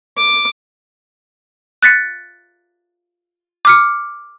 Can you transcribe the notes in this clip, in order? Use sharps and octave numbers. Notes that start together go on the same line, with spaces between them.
D6
F#6 A6 B6 C#7
D6 F6 C#7